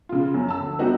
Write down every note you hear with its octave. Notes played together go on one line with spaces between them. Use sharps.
C#3 F4
F#2
A5 E6
D2
G3 B3 D4 D#4 F#4 G4